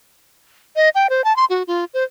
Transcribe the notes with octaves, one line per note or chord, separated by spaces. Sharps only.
D#5
G5
C5
A5
C6
F#4
F4
C5